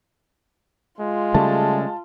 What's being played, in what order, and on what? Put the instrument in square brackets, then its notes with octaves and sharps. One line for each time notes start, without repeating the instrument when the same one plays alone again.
[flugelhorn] G#3 [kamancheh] F4
[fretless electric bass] C#3 G3 A3 [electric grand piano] A5